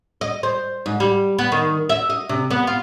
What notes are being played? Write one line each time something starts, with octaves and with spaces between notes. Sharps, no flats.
D#5
C5
G#2
G3
B3
D#3
E5
D#5
C3
B3
F4